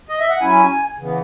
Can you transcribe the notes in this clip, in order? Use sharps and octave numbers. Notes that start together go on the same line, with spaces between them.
D#5
E5
F#5
F#3 C#4 E4 G#5
C#3 E3 B3